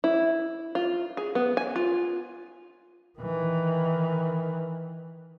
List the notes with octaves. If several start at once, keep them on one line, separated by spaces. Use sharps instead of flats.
E4
F4
G#4
B3
G#5
F4
D#3 E3